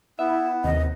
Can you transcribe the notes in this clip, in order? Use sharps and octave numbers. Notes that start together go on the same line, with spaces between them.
B3 E4 E5
D#2 C3 D#5